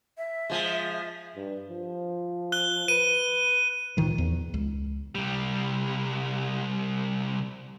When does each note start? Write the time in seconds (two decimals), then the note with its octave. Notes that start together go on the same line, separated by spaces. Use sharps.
0.18 E5
0.50 F3 G#3
1.36 G2
1.69 F3
2.52 F#6 G7
2.88 B4 D#7
3.97 C#2 A#2 D#3 F3
4.18 E2
4.54 C#2
5.15 C2 G3